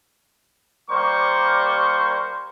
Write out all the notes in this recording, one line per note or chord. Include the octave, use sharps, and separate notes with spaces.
G3 A#3 A#4 C5 D5 C#6